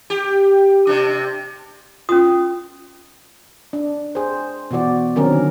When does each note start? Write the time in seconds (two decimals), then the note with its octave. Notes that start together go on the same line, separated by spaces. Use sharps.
0.10 G4
0.87 C3 D4
2.09 C#4 F4 D#6
3.73 D4
4.15 G#4 C5
4.71 B2 E3 F#4 D5
5.16 D3 D#3 F#3 C4 C#4 A#4